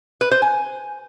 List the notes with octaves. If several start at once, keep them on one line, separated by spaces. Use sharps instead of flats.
B4
C5
G#5